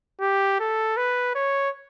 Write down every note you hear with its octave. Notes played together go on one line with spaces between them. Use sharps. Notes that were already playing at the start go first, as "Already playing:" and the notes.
G4
A4
B4
C#5